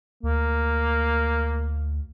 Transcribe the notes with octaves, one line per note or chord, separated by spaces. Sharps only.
D2 A#3